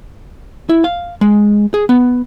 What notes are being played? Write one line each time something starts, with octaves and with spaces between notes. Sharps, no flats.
E4
F5
G#3
G#4
B3